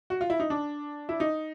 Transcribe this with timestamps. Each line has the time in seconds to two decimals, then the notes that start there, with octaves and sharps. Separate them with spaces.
0.10 F#4
0.21 F4
0.30 E4
0.40 D#4
0.50 D4
1.09 E4
1.20 D#4